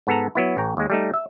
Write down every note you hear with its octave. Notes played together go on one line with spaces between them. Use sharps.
G#2 B3 A4 A#5
F#3 B3 E4
A1 C#5 G5 A#5
D#2 G#3
G3 A3 D#4
E5